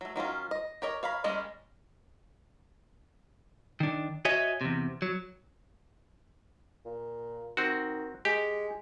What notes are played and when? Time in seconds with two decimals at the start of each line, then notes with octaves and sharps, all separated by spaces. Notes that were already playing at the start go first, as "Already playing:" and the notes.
0.01 F#3 A3
0.16 D#3 F#3 C#4 F4
0.51 D#5
0.82 G4 A#4 C#5 D#5
1.03 C#5 F5 A#5 B5
1.24 G3 G#3 A#3 C#4 D#5
3.80 D#3 D4
4.25 F#4 C#5 D#5 E5 G#5
4.61 E2 C3
5.02 F#3
6.85 A#2
7.57 D#3 C4 F#4
8.25 G#3 G4